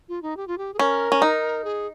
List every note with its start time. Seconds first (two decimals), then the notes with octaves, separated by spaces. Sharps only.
0.09 F4
0.22 D#4
0.37 G4
0.48 F4
0.58 G4
0.74 G#4
0.79 C#4 A#4
1.12 C#4
1.22 D#4
1.64 G#4